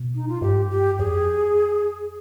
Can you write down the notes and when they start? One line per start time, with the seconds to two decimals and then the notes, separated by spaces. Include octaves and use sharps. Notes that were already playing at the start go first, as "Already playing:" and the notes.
Already playing: B2
0.15 D#4
0.28 F4
0.42 G2 G4
0.51 G#2
0.61 G2
0.71 G4
0.99 F2 G#4